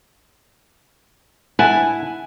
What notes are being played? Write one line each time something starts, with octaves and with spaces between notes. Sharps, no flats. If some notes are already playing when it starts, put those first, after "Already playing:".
E4 F#5 G#5 A5